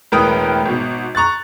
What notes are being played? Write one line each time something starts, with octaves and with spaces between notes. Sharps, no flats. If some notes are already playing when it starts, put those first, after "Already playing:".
E1 A2 A#4 B4 G5 D#6
G#1 B2
A#5 C#6 F#6 A6